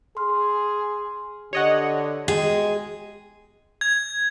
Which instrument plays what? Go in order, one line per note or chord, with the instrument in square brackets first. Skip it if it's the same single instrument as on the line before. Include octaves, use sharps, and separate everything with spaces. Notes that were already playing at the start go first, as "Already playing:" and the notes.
[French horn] G#4 [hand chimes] C6 F6
[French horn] D3 [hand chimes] G4 [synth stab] C#5 D#5 F#5
[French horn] G#3 [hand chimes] F#4 G5 [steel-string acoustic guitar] G#4
[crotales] G#6